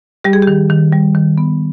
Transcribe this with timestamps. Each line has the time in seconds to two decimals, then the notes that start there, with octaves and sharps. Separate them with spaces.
0.24 G3 G4
0.33 G#4
0.42 D#3 G4
0.70 D#3
0.92 G3
1.15 D#3
1.38 B3